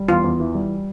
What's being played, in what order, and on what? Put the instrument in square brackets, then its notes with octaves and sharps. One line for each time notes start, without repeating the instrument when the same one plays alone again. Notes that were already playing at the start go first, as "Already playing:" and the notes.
Already playing: [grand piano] G3
[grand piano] E2 [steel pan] F4
[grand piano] E2
E3
G3